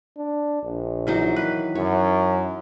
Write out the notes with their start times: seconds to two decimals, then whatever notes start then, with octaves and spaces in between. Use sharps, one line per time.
0.17 D4
0.63 A#1
1.07 E3 F#3 D#4
1.36 D#3 B4
1.75 F#2 C#5